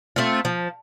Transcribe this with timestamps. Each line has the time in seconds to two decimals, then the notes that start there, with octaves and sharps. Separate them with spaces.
0.16 A3 C4 F4
0.45 F3